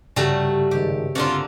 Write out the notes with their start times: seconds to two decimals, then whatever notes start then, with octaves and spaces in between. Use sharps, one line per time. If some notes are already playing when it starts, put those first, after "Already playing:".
0.16 G2 C#3 F#3 G3 A3 F#4
0.71 G#1 G4
1.15 D3 A3 A#3 C4 F4